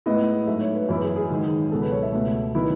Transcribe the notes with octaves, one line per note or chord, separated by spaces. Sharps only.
A2 G#3 B3 E4 D#5
G#2 F#3 A3 E5
C#5
B4
F#2 E3 B3 E4
G#4
G#4
G#2 D#3 F#3
C#2 B2 F#3 A4
B4
C#5
E5
C#2 B2 A3
D#3 F#3 B3 E4